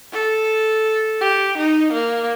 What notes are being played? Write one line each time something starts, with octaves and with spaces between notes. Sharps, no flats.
A4
G4
D#4
A#3